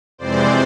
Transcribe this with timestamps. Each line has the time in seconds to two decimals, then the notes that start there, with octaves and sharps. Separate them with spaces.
0.18 F2 C3 E3 G#3 C4 C5 D5